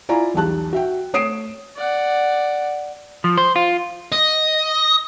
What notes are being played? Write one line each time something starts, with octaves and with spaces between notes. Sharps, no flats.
E4 F4 D5 G#5 A#5
B1 E2 G3 A5 F#6
F#4 E5 G5
A3 C#5 D#6 C7 D7 E7
D5 F#5
F3
C5
F4
D#5